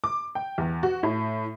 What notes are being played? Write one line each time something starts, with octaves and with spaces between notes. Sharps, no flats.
D6
G5
E2
F#4
A2